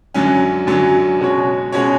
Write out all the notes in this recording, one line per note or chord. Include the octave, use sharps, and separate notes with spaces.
F#2 D3 F#3 C#4
F#2 D3 F#3 C#4
B2 G#3 C#4 F#4 C#5
B2 G#3 C#4 F#4 C#5